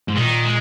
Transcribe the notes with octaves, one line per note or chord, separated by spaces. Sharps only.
G#2
A#2 D#3
G#3